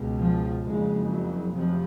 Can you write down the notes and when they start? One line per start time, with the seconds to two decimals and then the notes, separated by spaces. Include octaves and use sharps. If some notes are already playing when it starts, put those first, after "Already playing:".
Already playing: C#2 B2
0.17 F3
0.64 F#1 F2 C#3 G#3
1.09 F#3
1.54 F1 F2 F3